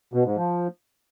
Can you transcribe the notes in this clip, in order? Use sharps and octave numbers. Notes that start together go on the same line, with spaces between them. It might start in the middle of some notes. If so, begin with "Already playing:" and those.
B2
G#2
F3